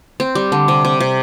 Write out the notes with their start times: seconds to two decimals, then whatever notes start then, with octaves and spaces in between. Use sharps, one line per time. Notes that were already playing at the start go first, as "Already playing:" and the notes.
0.20 C4
0.35 G3
0.52 D3
0.68 C3
0.85 C3
1.00 C3